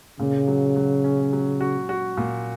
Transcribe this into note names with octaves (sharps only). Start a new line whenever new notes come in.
A#2 C#3
F#3
F#3
C#4
F#3
F#4
F#4
A#2